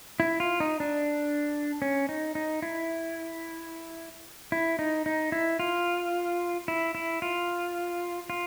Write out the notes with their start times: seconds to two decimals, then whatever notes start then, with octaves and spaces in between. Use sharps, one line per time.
0.20 E4
0.40 F4
0.60 D#4
0.80 D4
1.82 C#4
2.09 D#4
2.35 D#4
2.62 E4
4.52 E4
4.79 D#4
5.06 D#4
5.32 E4
5.60 F4
6.68 E4
6.95 E4
7.22 F4
8.30 F4